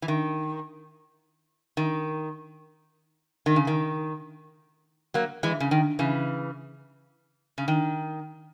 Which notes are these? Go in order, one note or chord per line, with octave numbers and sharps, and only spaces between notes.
E3
D#3
D#3
D#3
C#3
D#3
F#3 A#3
E3 G#3
C#3
D#3
C#3 E3
C#3
D#3